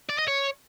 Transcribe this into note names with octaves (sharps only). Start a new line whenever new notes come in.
D5
D#5
C#5